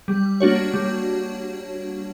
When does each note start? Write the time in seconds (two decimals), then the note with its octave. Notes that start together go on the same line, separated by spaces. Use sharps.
0.08 G3
0.40 A#3 D4 F#4 C#5
0.74 G3